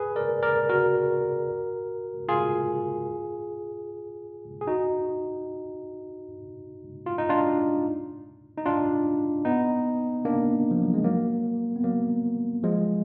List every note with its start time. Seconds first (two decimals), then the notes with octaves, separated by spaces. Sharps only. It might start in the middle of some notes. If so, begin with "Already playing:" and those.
Already playing: G#4 B4
0.16 A#4 D5
0.43 A#4 D5
0.69 F#4 A#4
2.29 F4 G#4
4.61 G#4
4.67 D#4 F#4
7.06 F4
7.18 D#4
7.29 D4 F4
8.58 D#4
8.66 D4 F4
9.45 B3 D#4
10.25 A#3 D4
10.71 F3
10.82 F#3
10.94 G#3
11.04 F#3 A#3
11.76 B3
11.84 F#3 A#3
12.63 F3 G#3